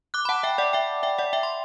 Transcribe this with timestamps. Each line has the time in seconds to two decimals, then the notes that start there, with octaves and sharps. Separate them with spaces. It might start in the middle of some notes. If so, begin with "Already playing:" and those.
0.14 D6 F#6
0.25 B5
0.29 F#5 A5
0.43 E5 G5
0.58 D5 F#5
0.73 E5 G5
1.03 E5 G5
1.18 D5 F#5
1.33 E5 G5
1.43 C6